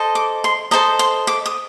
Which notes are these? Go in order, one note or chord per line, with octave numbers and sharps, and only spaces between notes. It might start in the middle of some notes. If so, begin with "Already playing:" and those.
Already playing: A4 C5 D#5
D6
C6
A4 C5 D#5 A#5
C6
D6
D#6